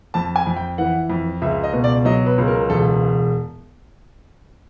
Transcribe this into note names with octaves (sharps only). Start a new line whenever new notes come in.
F2 A5
G#5
F2
G5
E3 F#5
F2
C#2 E5
D#5
B2
D5
F#3 D#5
B4
C#2
A#4
E1 A4